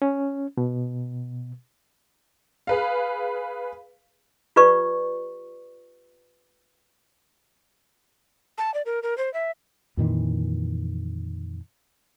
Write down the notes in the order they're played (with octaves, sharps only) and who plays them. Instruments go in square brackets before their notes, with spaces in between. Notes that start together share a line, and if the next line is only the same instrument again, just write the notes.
[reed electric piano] C#4
B2
[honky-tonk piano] G#4 B4 F5
[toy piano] F4 G4 B4 D5 C#6
[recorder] A5
D5
A#4
A#4
C5
E5
[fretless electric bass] F2 A#2 D#3 E3